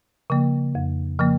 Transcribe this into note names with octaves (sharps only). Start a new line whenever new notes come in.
C#3 F3 A#3
F2
C#3 F3 A#3